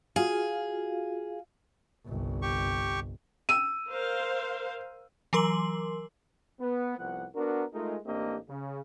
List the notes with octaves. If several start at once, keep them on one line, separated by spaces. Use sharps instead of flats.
F4 F#4 G#4 F5
G1 C2
G4 C#6
E6 D#7
A#4 C5 F5
E3 F#3 A#4 C6 C7 F#7
B3
C2 F3 B3 F#5
B3 D4 F#4 A#4
G#3 A3 D#4 F4 G#4 A#4
A1 A#3 C4 D4 G4 D#5
C#3